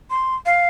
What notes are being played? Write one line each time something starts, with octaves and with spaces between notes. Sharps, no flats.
C6
F5